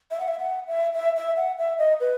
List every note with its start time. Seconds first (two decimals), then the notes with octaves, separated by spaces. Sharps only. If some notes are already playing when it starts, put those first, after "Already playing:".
0.11 E5
0.20 F#5
0.28 E5
0.40 F#5
0.67 E5
0.95 E5
1.17 E5
1.37 F#5
1.59 E5
1.78 D#5
2.00 B4